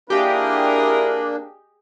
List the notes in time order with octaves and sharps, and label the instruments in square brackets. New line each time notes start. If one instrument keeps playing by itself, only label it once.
[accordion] A#3 D4 [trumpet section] E4 F4 A#4 [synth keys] G4 [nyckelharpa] G#4 D#5